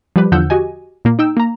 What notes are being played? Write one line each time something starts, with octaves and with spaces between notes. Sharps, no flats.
F3 G3 G4 B4
E2 D3 F3 F#5 E6 G6
F#4 G4 D#5 G#5
A#2 A#3
D#4 G5 E6
A#3 A#5